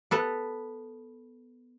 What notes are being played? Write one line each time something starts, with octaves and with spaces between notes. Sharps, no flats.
B3 A4 B4